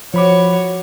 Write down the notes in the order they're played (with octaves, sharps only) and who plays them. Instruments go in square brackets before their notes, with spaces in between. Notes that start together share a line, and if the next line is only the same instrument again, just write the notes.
[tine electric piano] F3 B5 D6 [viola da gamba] F#4 C#5